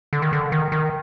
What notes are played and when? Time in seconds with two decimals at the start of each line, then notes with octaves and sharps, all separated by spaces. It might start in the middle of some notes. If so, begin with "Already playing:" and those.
0.13 D3
0.22 D#3
0.33 D3
0.52 D#3
0.72 D#3